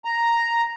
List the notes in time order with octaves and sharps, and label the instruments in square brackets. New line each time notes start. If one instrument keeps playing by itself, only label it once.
[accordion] A#5